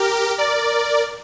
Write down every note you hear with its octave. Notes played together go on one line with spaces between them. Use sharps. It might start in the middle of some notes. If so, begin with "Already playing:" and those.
Already playing: G4 A#4
A#4 D5